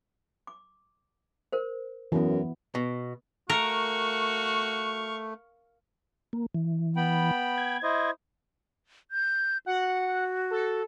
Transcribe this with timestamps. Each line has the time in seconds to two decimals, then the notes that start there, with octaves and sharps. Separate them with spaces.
0.47 D6
1.52 A#4 C5
2.12 F#2 E3 B3
2.75 B2
3.50 A3 F#4 A#4 F5 C#6
6.33 A#3
6.54 E3
6.96 B3 G5 B5
7.58 G#6
7.83 E4 C5 D#5
9.11 G6
9.66 F#4 F#5
10.51 A4